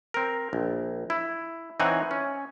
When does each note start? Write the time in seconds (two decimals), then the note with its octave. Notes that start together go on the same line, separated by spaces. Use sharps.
0.14 C4 A#4
0.53 A#1
1.10 E4
1.80 E3 C4 D#4 C#5 F#5 G#5
2.11 C#4